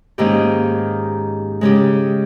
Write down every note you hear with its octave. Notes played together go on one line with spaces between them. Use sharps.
G#2 D#3 A#3 C#4 G4
C#3 G#3 C#4 G4